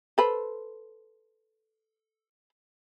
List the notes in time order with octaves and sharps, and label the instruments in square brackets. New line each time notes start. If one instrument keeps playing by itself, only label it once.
[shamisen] A4 B4 C5